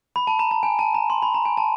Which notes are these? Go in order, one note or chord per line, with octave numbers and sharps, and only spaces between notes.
B5
A5
A#5
A5
G#5
A5
A#5
C6
B5
A#5
G#5
A5